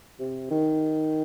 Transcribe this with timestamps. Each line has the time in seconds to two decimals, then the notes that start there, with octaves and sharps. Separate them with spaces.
0.20 C3
0.51 D#3